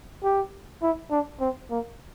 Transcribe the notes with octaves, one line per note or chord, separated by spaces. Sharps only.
G4
E4
D4
C4
A#3